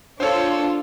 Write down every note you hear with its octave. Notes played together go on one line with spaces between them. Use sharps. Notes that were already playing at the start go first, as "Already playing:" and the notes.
D4 F4 A4 C5 C#5